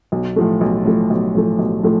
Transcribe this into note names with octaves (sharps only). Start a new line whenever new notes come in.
B1
A2 F3 A3
B1
A2 F3 A3
B1
A2 F3 A3
B1
A2 F3 A3